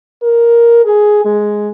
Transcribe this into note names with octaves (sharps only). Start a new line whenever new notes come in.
A#4
G#4
G#3